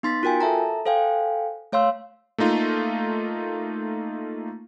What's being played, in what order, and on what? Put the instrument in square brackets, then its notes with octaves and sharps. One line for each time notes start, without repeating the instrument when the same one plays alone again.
[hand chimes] B3 D#4 C6 A6 B6
F4 F#4 A#4 G5 G#5
A4 E5 A5 A#5
A4 C5 F5 G5 G#5
A3 C#5 F5 C6 E6
[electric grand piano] A3 A#3 D#4 F4